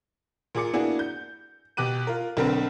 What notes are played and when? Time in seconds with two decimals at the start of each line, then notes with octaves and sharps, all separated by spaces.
0.55 A#2 G#4 D6 C#7
0.73 A#3 B3 D4 E4 F#4 G#4
0.99 G6
1.77 B2 G4 D6 F#6 D#7
2.07 F4 A#4
2.37 B1 D3 C4 A#4 B4